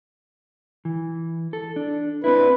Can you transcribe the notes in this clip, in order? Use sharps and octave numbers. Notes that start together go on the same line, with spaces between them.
E3
A4
D4
C4 D4 E4 B4